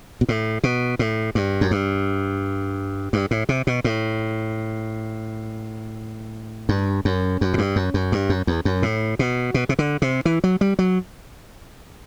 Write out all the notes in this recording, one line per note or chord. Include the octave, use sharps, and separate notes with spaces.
B2
A2
B2
A2
G2
F#2
G2
G2
A2
C3
B2
A2
G2
F#2
F#2
A2
G2
F#2
F#2
G2
F#2
E2
F#2
A2
B2
B2
C3
D3
C3
E3
F#3
G3
F#3